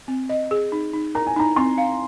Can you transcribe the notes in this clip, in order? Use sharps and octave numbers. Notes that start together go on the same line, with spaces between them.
C4
D#5
G#4
D#4
D#4
A#4 A#5
G#5
D#4 A#5
C4 C6
F5